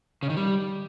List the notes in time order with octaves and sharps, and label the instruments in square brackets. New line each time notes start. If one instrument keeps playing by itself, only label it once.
[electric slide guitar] C#3
D#3
G3